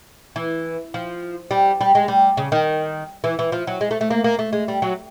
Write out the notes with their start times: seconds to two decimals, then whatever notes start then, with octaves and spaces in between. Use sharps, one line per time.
0.36 E3
0.94 F3
1.51 G3
1.81 G3
1.95 G#3
2.08 G3
2.37 C#3
2.52 D#3
3.24 E3
3.39 E3
3.52 F3
3.67 F#3
3.81 G#3
3.91 A3
4.01 A3
4.10 A#3
4.24 A#3
4.39 A3
4.53 G#3
4.68 G3
4.82 F#3